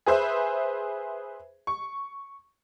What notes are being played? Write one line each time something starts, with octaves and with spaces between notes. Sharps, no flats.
G#4 B4 C5 E5
C#6